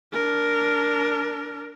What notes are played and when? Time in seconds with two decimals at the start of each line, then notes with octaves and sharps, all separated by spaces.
0.13 D4 A#4